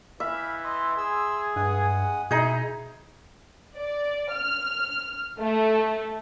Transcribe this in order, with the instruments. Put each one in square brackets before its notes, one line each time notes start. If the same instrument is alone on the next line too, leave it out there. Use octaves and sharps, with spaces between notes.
[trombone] E3 [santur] E5 [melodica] F5 B5
[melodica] D#5 [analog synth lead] C6
[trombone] G#4 [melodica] E6
[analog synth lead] G2 [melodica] G#3 F#5 D#6
[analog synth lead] B2 [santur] D#4 G#4 [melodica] E4
[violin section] D5
F6
A3